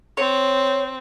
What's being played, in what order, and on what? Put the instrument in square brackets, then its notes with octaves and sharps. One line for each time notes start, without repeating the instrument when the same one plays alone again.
[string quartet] C4 [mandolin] C#5